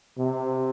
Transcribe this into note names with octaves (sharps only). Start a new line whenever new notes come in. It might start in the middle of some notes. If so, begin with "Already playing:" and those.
C3